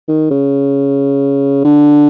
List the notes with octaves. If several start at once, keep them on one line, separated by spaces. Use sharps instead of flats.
D#3
C#3
D3